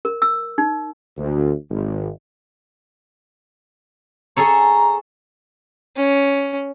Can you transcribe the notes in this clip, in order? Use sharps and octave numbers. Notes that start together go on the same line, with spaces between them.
A#4
E6
D#4
D2
G#1
G#4 A4 C#5 A#5
C#4